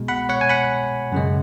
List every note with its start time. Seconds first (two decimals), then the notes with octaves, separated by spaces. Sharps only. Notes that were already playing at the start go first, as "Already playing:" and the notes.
Already playing: B2 G#3
0.08 F#5 B5
0.29 C#5 F#5
0.41 G#5
0.49 F#5 B5
1.12 F#2 C#3 G#3